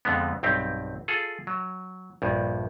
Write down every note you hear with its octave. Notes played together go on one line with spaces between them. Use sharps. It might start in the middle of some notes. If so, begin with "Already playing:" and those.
F2 D3 G#3 B3
B1 G2 C4 G4
F4 G#4 A4
F#3
A#1 G2